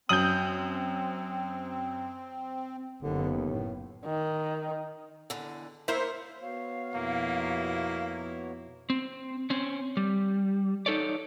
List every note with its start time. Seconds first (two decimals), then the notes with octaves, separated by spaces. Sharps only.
0.09 F#2 C4 D#6 G6 F#7
3.02 F#1 D#2 D3 B3
3.47 A2
4.05 D#3
5.30 E2 D3
5.88 A#3 E4 A#4 C5 C#5 E5
6.41 B3 F#4 C#5 F5
6.95 F2 B2 A#3 E4
8.90 C4
9.50 C4 C#4
9.97 G3
10.86 D#4 A4 C#5 D5